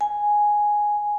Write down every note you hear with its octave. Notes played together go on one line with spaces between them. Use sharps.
G#5